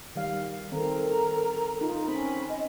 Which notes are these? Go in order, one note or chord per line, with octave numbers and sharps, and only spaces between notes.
D#3 G3 F5
D#3 C4 A4 A#4 A#5
D#4 F4
C4 C#4 B5
D#5